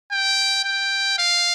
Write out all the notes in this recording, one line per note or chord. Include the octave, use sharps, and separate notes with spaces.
G5
G5
F5